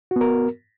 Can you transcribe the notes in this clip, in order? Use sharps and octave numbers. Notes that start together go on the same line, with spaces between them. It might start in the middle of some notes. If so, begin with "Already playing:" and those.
B3 F#4 A#4